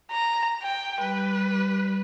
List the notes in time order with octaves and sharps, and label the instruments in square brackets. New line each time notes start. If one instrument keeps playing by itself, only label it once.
[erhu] A#5
G5
[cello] G3 [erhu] B4